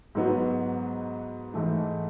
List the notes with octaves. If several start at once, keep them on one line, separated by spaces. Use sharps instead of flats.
G#2 F#3 B3
G#2 E3 A3